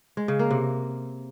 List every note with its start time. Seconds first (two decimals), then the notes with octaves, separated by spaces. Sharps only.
0.17 G#3
0.28 C#3
0.39 A#3
0.51 C3